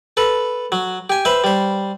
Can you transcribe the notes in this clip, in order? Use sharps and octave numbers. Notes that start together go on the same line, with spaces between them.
A4 B4
F#3
G4 G#5
B4 C5 E5
G3 C5